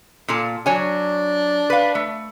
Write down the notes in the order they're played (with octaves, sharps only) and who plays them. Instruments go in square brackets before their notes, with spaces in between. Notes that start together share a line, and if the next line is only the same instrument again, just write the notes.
[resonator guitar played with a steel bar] A#2 F4 A4
[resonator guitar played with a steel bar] F#3 C#5 G#5 [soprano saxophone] D4
[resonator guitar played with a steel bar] B4 F5
A3